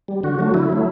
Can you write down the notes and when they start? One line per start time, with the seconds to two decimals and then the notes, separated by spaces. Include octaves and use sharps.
0.08 G3
0.23 D3 F#4
0.39 F#3 A3 F#4
0.54 D3 E4
0.70 F#3 A3